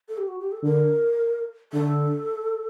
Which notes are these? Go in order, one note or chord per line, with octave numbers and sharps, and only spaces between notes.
A4
G4
F#4
G4
A4
D3 A#4
D3 A4